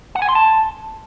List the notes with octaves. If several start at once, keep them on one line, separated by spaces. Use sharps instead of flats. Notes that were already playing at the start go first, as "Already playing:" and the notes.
F#5
G#5
C6
A5